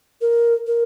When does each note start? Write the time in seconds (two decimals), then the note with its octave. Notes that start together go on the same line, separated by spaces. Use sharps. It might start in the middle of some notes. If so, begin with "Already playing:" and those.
0.21 A#4
0.67 A#4